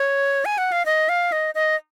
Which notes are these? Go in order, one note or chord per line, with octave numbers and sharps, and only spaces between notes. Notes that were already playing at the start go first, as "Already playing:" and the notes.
Already playing: C#5
G#5
F#5
F5
D#5
F5
D#5
D#5